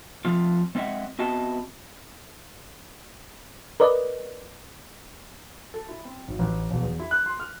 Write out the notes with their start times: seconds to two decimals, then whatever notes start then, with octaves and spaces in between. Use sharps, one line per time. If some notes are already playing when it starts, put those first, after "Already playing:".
0.25 F3 A3 C4 F4
0.75 G#3 C4 D#5 E5 F#5
1.19 B3 C4 F#4 D#5 E5 A5
3.80 A#4 B4 D5 D#5
5.74 A4
5.89 E4
6.05 C4
6.28 G#1
6.39 A1
6.71 E1
6.82 E2
7.00 E4
7.11 F#6
7.26 C6
7.40 F6